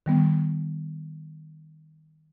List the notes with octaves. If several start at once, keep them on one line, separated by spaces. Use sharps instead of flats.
D#3 G3 B3